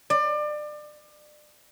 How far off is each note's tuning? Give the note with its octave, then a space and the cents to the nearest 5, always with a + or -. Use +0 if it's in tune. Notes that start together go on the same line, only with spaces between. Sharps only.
D5 +30